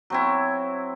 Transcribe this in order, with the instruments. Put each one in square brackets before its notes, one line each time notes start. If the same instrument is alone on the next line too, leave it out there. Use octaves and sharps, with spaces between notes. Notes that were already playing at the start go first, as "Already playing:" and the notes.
[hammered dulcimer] F#3 C4 E4